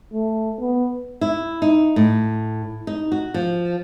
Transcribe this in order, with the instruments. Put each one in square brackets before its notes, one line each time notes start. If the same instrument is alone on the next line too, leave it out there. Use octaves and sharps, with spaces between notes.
[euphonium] A3
B3
[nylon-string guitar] E4
D#4
A2
D#4
F#4
F3